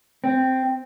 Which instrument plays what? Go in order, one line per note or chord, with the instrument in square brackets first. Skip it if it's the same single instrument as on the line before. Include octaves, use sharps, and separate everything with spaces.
[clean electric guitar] C4